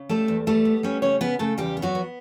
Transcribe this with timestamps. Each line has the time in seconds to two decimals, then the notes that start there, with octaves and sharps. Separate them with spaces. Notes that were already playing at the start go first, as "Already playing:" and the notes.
Already playing: C#3
0.09 G3 A3 A4
0.28 E2
0.47 G3 A3 A4
0.65 B3
0.83 G3 C#4 C#5
1.02 C#3 C#4 C#5
1.21 C#3 B3 B4
1.39 C#3 A3 A4
1.58 E2 G3 G4
1.77 B3
1.82 F#3 F#4
1.95 B3